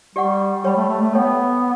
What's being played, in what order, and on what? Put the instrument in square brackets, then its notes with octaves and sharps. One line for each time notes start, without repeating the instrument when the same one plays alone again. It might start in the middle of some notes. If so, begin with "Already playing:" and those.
[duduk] G3 [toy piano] G4 D5 F#5 C#6
[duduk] G3 [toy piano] G4 C#5 G5 B5
[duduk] A3
A3
A3
[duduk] B3 [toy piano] A4 C#5 G5